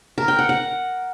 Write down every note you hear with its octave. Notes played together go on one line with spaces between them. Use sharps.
A#4
G5
F#5
F#5